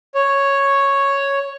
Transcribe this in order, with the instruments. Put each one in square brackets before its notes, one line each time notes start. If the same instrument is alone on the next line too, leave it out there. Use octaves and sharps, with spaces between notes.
[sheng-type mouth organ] C#5